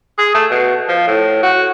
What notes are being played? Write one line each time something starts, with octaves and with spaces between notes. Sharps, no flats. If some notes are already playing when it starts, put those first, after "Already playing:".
G#4
A3
B2
F3
A2
F#4